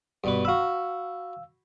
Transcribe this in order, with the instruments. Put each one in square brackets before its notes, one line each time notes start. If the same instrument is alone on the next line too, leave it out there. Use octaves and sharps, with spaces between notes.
[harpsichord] G2 B2 B4
[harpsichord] F#4 B5 [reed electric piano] F5 E6